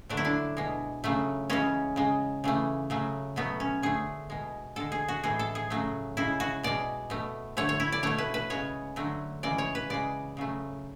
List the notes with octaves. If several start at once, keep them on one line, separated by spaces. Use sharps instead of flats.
D3 F#3 A3 D4
E4
D4
B2 G#3
C#3 F#3 A3
C#3 E3 G#3 C#4
C#3 G#3
C#3 E3 A3
C#3 F#3 A3
B2 F#3 A3 B3
C#4
D3 A3 G#4
B2 G#3
D3 G#3 A4
G#4
F#4
A2 E3 G#3 G#4
A4
G#4
C#3 F#3 A3
C#3 G#3 E4
F#4
B2 G#3 D5
B2 A3
D3 A3 C#5
C#5
E4
D5
B2 A3 C#5
B4
B4
C#3 G#3 C#5
D3 F#3 A3
C#3 E3 G#3 D5
C#5
B4
C#3 G#3 D5
C#3 F#3 A3